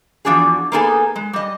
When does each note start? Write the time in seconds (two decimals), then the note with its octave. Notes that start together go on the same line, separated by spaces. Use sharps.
0.25 E2 F3 D4 F#4 G#4
0.72 A#3 B3 D#4 G#4 A4 G#5
1.16 G#3
1.33 G3 D#5